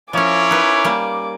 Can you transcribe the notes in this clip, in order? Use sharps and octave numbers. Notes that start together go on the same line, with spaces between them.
F3 C#4 E4 A#4 C#5 G#5 D6
D#4 B4
G3 A#3